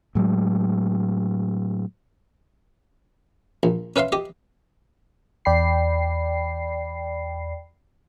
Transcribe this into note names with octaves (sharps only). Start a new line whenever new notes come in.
A2 F#3 G#3
A#1
C#4 B4 E5 F5 C6
G4 D#5
E2 D5 G5 B5 C7